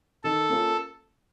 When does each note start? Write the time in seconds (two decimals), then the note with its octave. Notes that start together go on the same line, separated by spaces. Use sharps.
0.24 D#3 A4
0.49 A#3 C#4 F4 A#4